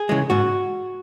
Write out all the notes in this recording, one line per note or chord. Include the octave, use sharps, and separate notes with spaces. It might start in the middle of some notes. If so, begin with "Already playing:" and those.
Already playing: G#4
C#3 E3 G#3
G#2 F#4